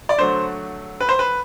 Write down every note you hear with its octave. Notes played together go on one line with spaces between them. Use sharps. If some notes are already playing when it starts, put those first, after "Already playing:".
D5
D3 F#3 A3 C5
B4
C5
B4